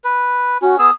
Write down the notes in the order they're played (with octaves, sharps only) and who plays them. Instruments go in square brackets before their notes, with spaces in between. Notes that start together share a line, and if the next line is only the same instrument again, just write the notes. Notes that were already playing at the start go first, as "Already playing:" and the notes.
[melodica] B4
[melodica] C#4 [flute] F#4
[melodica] B3 G#4 E6 [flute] D#6